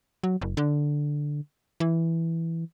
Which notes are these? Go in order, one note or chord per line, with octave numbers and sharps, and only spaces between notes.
F#3
F#1
D3
E3